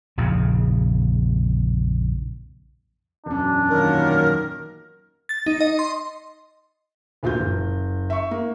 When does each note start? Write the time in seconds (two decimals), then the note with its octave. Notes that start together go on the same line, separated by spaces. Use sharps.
0.17 A#1 F2 C#3
3.26 E1 F#2 D4
3.70 A#2 D#3 F#3 A#4
5.29 A6
5.46 D#4
5.61 D#5
5.79 C6
7.23 D2 A#2 F4 F#4 G6
7.40 F#1
8.10 E5 C#6
8.31 A#3